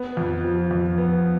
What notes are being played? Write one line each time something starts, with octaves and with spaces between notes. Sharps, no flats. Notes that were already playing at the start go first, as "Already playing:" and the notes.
Already playing: B3
F2
F3
F2
B3